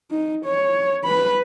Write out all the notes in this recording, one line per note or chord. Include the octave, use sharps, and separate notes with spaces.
D#4
C#5
B4 B5